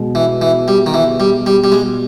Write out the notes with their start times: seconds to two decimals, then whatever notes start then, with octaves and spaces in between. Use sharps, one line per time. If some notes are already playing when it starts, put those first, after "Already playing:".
Already playing: B2 G#3
0.15 E3
0.42 E3
0.68 G3
0.86 D#3
0.94 E3
1.20 G3
1.46 G3
1.64 G3
1.72 G#3